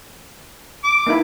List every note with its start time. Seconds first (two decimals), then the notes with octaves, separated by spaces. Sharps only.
0.84 D6
1.07 A#3 D#4 E4